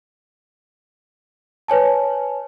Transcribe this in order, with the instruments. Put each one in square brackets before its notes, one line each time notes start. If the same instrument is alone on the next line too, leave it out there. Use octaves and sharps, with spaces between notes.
[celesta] B4 C#5 G#5 A5